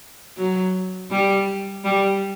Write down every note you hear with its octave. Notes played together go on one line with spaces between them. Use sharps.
F#3
G3
G3